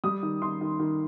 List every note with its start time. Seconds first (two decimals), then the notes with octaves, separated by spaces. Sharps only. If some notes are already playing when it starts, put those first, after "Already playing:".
0.04 G3 D#6
0.23 D#3
0.42 D#3 C6
0.61 D#3
0.80 D#3